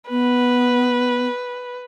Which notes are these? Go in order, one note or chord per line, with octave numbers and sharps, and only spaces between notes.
B3 B4